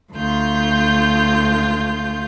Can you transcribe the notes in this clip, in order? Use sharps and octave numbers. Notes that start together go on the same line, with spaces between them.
D2 F4 G6